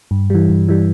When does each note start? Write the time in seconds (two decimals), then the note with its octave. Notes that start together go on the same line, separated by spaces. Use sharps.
0.11 G2
0.30 E3 G3
0.49 G2
0.69 E3 G3